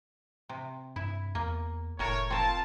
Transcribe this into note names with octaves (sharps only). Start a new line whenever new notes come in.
C3
G2 E4
E2 A#3
F1 A2 A#4 C#5 A5
C4 F4 A#4 A5